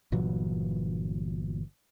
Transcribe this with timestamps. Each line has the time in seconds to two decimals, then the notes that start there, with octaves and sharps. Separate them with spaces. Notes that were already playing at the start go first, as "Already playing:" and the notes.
0.12 G1 A#2 E3 F#3